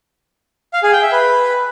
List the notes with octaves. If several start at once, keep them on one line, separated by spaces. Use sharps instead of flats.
F5
G#4
G5
E5
B4